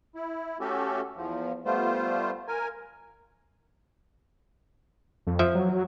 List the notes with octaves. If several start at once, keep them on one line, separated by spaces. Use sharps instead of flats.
E4
A3 C#4 F#4 G4 A4
E2 F3
G3 A3 B3 F4 C5
A#4 G#5
F2
F3 E5
F#3